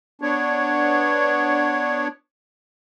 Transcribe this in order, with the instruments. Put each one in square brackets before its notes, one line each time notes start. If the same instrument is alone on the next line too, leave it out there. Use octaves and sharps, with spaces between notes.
[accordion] B3 D4 C#5